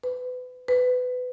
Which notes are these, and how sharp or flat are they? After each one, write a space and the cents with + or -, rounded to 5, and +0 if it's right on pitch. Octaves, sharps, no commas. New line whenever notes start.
B4 +25
B4 +20